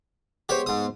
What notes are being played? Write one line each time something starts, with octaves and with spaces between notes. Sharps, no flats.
G#3 B3 G4 C5 C#5
G#2 D#6